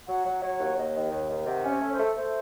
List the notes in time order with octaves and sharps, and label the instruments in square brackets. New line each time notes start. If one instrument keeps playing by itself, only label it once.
[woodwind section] F#3 [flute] F#5
[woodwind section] F#3
[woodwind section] F#3 [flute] C#5
[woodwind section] D#2
[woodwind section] D#2 [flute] D#5
[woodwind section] D#3
D#2
D#3
[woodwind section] C3 [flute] F#5
[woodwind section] C#4
[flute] C#5
[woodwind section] A3
[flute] C5
[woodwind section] A3
[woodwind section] A3 [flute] C5